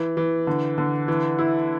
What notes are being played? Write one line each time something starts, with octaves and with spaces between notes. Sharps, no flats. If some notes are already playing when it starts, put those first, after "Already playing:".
Already playing: E3
E3
D3
D3
E3
E4